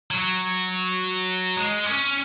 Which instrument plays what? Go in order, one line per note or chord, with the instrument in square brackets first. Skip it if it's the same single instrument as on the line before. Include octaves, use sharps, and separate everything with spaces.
[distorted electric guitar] F#3
G#3
C#4